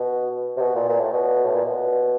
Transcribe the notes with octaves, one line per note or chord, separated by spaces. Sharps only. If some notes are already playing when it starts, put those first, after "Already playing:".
Already playing: B2
C3
B2
A#2
A#2
A2
B2
A2
A#2
B2